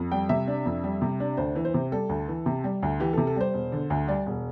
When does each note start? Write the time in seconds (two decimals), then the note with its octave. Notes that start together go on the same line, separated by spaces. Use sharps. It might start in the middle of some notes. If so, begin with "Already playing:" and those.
Already playing: F2
0.12 G3 G5
0.29 C3 E5
0.48 D4
0.66 F2
0.84 G3
1.02 C3
1.20 D4
1.37 D2 C5
1.55 E3
1.65 C5
1.74 C3
1.92 G3 A4
2.09 D2
2.28 E3
2.46 C3
2.64 G3
2.83 D2
3.00 E3 G4
3.13 A4
3.17 C3
3.27 A4
3.36 G3 C5
3.54 E1
3.72 D3
3.90 D2
4.08 G3 D5
4.26 E1